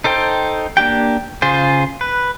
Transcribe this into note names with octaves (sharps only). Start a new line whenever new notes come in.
D#4 A4 C5 G5
A#3 D4 G4 G5
C#3 F4 G#4 C5
B4